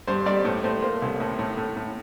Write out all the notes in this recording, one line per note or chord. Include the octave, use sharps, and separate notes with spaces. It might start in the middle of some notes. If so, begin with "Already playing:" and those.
G2 C5
G2 D5
A2 C5
A2 C5
A#3 C5
C2
A2
A2
A2
A2